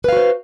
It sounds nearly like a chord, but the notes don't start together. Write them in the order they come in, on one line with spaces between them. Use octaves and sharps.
B4 F5 F#4 C5